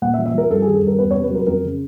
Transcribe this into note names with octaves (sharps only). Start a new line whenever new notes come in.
A#2 F#5
E5
F3
E5
F3 A#4
G2 A4
D#3 G#4
A4
G2 A#4
E2 B4
C3 C#5
B4
F#3 A#4
F2 A#4
C#3